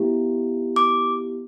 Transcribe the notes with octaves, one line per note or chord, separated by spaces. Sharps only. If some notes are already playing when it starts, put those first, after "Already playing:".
Already playing: B3 E4 G4
D6